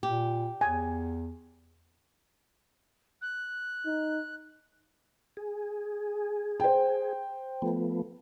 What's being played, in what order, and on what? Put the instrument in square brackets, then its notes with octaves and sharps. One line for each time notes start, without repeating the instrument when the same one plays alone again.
[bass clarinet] A#2 [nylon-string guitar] G4
[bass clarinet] E2 [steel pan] G#5
[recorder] F#6
[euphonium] D#4
[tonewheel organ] G#4
[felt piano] C5 G5
[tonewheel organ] F3 A3 B3